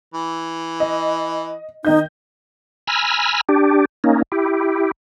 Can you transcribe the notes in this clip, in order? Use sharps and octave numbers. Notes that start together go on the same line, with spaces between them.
E3
D#5
D#3 D#4 D#5 G6
G#5 A#5 B5 E6 F6
D4 G4
A#3 C#4 D#4
E4 G4